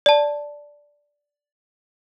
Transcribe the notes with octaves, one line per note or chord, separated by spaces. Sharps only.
D5 A5